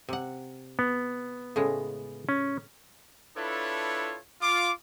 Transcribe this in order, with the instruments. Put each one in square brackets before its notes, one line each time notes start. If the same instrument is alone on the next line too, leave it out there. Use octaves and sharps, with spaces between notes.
[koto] C3 F#5
[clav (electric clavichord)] B3
[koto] A2 C#3 G#3
[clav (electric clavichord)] C#4
[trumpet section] D4 E4 F4 A4 B4 C#5
F4 D6